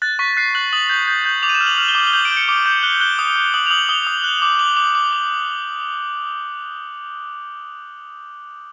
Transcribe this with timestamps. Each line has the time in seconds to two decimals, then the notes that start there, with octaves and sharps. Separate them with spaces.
0.02 F#6 A6
0.19 C#6 B6
0.37 F#6 C7
0.55 F#6 F#7
0.73 D#6 F#7
0.89 G6
1.08 G6
1.25 G6
1.43 D6 F7
1.49 D#7
1.55 E7
1.60 F6
1.67 F#7
1.78 F6 F#7
1.89 G7
1.95 D6 F#7
2.07 G7
2.13 G6 F#7
2.25 D7
2.31 G6
2.37 C#7
2.48 D6
2.66 G6
2.83 F#6 G7
3.00 F#6 G7
3.19 D#6
3.36 D#6
3.54 D#6 F#7
3.67 F7
3.71 D#6 F#7
3.89 D#6 G7
4.07 D#6
4.24 F#6
4.42 D6
4.59 D6 F#7
4.77 D6
4.95 D6
5.13 D6